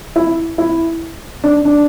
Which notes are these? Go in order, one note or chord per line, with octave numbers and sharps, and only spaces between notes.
E4
E4
D4
D4